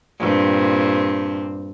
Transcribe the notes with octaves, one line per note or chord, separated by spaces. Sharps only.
G2 A#2 C4